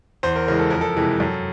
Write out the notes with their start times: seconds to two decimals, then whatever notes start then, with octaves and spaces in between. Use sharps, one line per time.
0.23 E2 C5
0.36 A#4
0.48 C#3 E3 G#3 A#4
0.59 A4
0.70 F2 A#4
0.81 A4
0.96 C3 E3 G#3
1.20 F#2